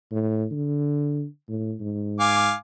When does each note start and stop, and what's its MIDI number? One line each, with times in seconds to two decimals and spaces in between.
0.12 0.45 45
0.51 1.25 50
1.49 1.75 45
1.81 2.53 44
2.20 2.54 77
2.20 2.54 80
2.20 2.54 86